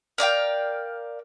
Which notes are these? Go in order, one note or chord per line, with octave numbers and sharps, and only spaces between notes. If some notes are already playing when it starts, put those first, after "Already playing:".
A#4 D5 F5 G5